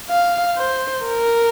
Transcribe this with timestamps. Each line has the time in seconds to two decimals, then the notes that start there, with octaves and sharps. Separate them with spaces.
0.09 F5
0.57 C5
1.06 A#4